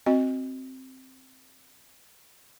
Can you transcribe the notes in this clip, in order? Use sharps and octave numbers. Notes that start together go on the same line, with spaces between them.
C4 F#4 D#5